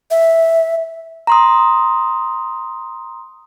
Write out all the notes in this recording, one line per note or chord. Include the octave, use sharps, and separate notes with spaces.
E5
A#5 C6 D#6